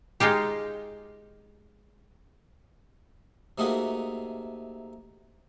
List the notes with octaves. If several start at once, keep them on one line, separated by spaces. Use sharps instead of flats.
G#3 D#4 F4 G4
C3 A3 A#3 D#4 F#4 G#4